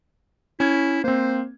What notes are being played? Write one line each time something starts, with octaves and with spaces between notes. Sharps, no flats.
C#4 E4 G#6
A#3 C4 C5